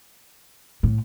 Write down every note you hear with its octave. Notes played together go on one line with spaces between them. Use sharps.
A2